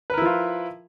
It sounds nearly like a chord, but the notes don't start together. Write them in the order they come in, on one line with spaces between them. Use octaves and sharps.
B4 A#4 E4 F3 F4